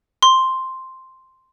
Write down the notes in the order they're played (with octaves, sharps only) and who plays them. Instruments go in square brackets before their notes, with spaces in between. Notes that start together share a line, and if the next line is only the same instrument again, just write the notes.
[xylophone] C6